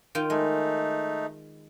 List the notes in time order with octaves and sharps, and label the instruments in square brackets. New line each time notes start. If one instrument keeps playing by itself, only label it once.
[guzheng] D#3 F4 G5
[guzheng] G#3 [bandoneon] A3 D#4